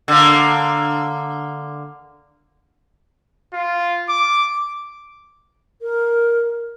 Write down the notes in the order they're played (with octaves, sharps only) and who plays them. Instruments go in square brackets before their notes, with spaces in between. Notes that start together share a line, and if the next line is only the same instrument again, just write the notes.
[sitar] D3 A#3
[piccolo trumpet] F4
D6
[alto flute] A#4